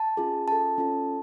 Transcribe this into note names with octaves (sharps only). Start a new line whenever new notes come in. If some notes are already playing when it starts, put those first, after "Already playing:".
Already playing: A5
C#4 F4 G#4
C#4 F4 A4 A5
C#4 F4 A4